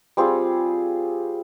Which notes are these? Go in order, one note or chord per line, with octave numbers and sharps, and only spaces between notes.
G3 C4 F4 G#4